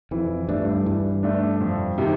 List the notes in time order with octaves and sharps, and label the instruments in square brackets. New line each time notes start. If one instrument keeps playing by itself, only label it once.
[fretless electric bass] F2 [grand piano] E3
[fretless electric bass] G2 [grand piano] A3 D4
[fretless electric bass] G2 [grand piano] E3
[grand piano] A3 D4
F2
C3 D#3